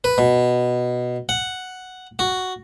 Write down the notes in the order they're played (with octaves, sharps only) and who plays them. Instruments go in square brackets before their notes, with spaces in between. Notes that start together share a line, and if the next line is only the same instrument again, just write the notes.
[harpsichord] B4
B2
F#5
F#4